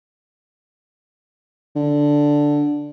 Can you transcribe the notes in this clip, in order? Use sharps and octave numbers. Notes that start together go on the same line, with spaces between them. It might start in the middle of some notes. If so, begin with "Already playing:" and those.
D3